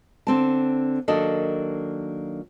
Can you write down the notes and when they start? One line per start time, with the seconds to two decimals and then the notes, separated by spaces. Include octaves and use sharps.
0.27 D3 C4 A5
1.08 D#3 F#3 A#3 D4 A4 D#5